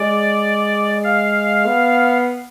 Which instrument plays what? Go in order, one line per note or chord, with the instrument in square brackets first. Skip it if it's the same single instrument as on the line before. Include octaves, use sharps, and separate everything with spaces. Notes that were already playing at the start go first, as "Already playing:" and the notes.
Already playing: [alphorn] G#3 [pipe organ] D5
[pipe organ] F5
[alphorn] B3